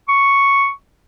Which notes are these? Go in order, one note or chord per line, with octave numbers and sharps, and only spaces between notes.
C#6